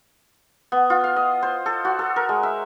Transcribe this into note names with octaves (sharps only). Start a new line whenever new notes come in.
B3
F4
F5
D#5
C5
A4
F#4
A4
A#4
G#3
E5